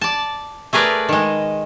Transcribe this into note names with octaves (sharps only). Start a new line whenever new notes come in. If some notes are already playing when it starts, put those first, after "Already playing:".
D5 A5
A3 G#4 A#4 B4 D5
D#3 G#3